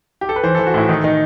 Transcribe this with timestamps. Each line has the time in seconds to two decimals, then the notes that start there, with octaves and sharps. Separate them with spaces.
0.21 G4
0.29 A4
0.36 B4
0.43 E3 C5
0.55 E3 A4
0.67 F#4
0.74 A2 E4
0.89 D#3 D#4
1.04 D#3 D#4